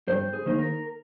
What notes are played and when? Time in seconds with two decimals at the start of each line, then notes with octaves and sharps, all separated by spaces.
0.08 G2 C5
0.33 G#4
0.46 D#3 A#3 D#4 C5
0.58 A#4